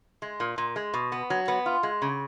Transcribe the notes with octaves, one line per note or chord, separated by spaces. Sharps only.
G#3
A#2
A#2
G#3
B2
B3
F#3
B3
F4
G#3
C#3